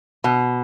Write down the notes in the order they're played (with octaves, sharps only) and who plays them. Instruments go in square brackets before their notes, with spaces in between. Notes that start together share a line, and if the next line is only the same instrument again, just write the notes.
[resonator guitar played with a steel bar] B2